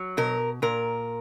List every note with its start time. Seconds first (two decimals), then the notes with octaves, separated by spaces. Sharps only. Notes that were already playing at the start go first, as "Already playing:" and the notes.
Already playing: F#3
0.17 B2 A#4
0.62 A#2 A#4